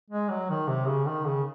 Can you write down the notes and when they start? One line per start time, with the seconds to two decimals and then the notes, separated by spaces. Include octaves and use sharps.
0.10 G#3
0.29 F#3
0.50 D#3
0.68 C3
0.88 C#3
1.06 D#3
1.25 C#3